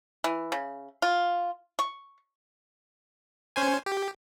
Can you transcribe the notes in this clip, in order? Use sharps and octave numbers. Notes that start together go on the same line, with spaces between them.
E3
C#3
F4
C#6
C#4 C5 G#5
G4